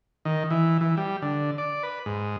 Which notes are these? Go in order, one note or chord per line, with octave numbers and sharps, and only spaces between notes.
D#3
E3
E3
G3
D3
D5
B4
G#2